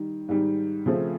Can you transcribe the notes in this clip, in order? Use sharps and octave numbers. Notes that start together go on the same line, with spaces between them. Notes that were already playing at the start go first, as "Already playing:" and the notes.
Already playing: D#3 G3
G#2 D#3 G3
C#3 F3 A3 C4